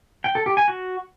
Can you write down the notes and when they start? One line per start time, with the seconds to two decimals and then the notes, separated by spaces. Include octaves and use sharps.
0.24 G5
0.35 A4
0.46 G4
0.57 G#5
0.68 F#4